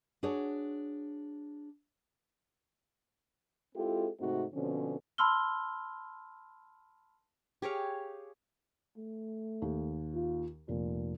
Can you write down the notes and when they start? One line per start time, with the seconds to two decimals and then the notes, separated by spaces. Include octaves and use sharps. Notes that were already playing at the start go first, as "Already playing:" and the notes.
0.23 D4 F#4 G#4 C#5
3.75 G#3 C4 E4 F4 G4 A4
4.20 G#2 C3 A3 C4 D#4 F#4
4.54 B2 D3 F3 C4 C#4
5.18 A5 B5 C6 E6 F6 G7
7.62 G4 G#4 C#5 F5
8.97 A3
9.62 D#2
10.14 F4
10.68 F1 A#2